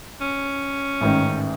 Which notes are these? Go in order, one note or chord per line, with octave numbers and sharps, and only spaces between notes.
C#4
A1 G#2 D#3